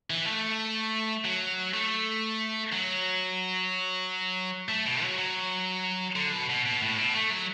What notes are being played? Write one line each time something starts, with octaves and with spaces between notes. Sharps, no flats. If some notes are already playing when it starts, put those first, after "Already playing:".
E3
A3
F#3
A3
F#3
A3
B2
F#3
F#3
D3
B2
B2
B2
A2
B2
A3
F#3